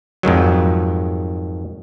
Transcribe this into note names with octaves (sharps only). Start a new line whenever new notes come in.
F2 G#2 D#3 F#3